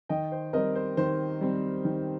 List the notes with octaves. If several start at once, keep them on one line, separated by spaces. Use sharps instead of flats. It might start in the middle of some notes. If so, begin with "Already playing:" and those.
D#3 D#5 G5
C5
G3 C4 A#4 D#5
C5
D#3 C5
G3 C4
D#3